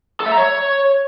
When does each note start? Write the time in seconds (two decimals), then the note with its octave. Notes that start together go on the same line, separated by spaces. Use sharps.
0.20 A4
0.26 E5
0.32 A#5
0.38 C#5